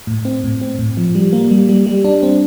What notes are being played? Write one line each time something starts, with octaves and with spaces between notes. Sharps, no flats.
A2
C4
A2
C4
A2
F3
G3
A#3
G3
G3
G3
D4
C4